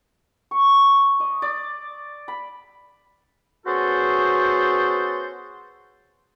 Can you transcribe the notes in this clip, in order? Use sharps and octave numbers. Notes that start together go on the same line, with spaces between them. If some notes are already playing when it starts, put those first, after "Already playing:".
C#6
D#5
D5
B5
B3 C#4 F#4 G#4 A4 C5